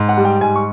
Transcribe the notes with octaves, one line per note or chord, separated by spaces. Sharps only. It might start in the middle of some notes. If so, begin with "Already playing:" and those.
Already playing: G#2
F#5
G3
G5
G#2 G#5
C#6